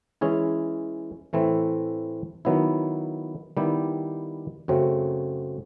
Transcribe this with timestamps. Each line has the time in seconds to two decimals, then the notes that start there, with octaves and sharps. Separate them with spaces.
0.21 E3 G#3 C#4 E4 G#4
1.33 A2 E3 A3 C4 E4
2.45 D#3 F#3 B3 E4
3.57 D#3 G3 B3 E4 G4
4.68 F#2 C#3 F#3 A3 C4